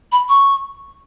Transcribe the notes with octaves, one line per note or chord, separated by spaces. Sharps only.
B5
C#6